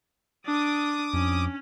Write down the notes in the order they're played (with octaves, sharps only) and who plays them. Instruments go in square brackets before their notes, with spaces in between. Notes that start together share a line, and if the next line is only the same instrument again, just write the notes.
[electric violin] D4 [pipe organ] D6 D#6
[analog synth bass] F2 [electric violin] C#4